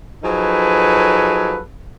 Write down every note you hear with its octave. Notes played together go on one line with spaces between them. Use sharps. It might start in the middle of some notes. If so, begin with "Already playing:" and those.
F3 F#3 D#4 G#4 A4 B4